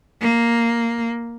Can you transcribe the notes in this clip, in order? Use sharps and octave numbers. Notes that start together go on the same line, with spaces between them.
A#3